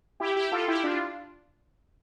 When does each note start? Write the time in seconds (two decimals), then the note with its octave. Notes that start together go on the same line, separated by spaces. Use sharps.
0.20 E4 G4
0.36 E4 G4
0.52 F4 A4
0.68 E4 G4
0.83 D4 F4